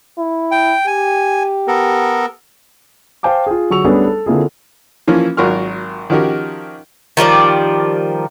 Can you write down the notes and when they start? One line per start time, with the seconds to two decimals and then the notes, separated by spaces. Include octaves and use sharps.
0.18 E4
0.51 G5
0.87 G4 G#5
1.68 B3 A4 A#4
3.23 C5 F5 G5 A5 D6
3.47 F4 G#4
3.70 D3 F#3 G#4 C#6 E6 F7
3.84 G3 A3 B3 C#4 D4 G#4
4.06 A4
4.26 D3 A#3 C4 E4 F4 G#4
5.08 E3 F3 A#3 C#4
5.37 G#1 F#3 F4 A#4 C#6 F6
6.10 D#3 F3 C#4 F#4 G4 A#4
7.17 D#3 F3 G3 D5